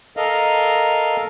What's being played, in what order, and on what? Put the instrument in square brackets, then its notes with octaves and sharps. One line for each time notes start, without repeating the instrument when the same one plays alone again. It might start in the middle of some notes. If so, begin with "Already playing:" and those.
[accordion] A4 A#4 D#5 F5